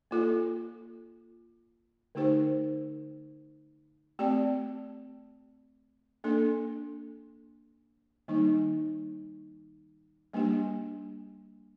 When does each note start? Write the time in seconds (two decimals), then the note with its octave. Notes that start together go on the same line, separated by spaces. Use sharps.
0.11 A#3 F4 A4
2.15 D3 A3 D#4 G4 C5
4.19 A3 C4 G4 D5
6.24 A#3 D4 A4
8.28 D#3 G3 A#3 D#4
10.33 G3 A#3 D4 G4